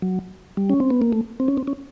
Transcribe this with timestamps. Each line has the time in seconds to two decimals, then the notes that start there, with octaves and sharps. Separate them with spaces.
0.02 F#3
0.57 G3
0.70 C#4
0.80 C4
0.90 B3
1.02 A#3
1.13 A3
1.40 C4
1.48 C#4
1.58 C4
1.67 C#4